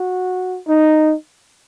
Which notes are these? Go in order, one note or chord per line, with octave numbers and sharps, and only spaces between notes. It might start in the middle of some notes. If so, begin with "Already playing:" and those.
Already playing: F#4
D#4